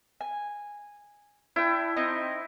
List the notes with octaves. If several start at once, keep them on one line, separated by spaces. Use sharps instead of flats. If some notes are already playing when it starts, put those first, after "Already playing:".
G#5
D4 E4 G5
C4 D#4 D#5